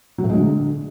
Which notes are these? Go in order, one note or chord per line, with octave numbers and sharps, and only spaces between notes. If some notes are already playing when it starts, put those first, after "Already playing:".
F#3
A2
G#3
D3